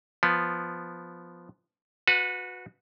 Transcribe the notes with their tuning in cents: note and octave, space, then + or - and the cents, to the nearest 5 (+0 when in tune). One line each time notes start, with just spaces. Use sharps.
F3 +0 B3 +0
F#4 -25 B4 +0 A5 -20